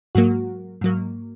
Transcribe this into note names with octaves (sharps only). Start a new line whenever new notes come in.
G#2 F#3 A#3 F#4
G#2 F#3 A#3